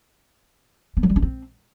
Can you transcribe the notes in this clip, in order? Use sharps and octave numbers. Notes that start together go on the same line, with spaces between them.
B3
F#3
G3
D4
C4